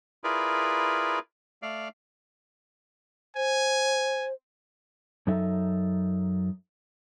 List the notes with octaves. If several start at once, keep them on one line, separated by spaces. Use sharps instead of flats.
E4 F4 G#4 A#4 B4 D5
A3 D5 F5
C5 G#5
F#2 F#3 D#4 A4 E5